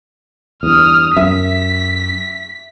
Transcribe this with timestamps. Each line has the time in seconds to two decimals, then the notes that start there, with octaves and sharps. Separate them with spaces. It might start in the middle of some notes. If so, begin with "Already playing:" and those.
0.63 E2 G2 D#6 F6
1.17 F#2 E5 B6